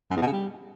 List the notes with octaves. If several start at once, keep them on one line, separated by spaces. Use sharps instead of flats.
F#2
E2
B2
C#3
G3